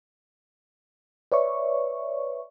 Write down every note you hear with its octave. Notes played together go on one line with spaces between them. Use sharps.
B4 C#5 D5 E5 C#6